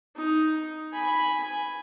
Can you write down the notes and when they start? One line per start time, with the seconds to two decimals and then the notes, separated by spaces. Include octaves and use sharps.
0.16 D#4
0.93 G#5 B5
1.42 G#5